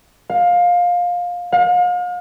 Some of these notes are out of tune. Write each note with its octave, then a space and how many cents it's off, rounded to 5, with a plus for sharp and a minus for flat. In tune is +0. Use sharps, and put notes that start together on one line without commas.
F5 +20
F5 +40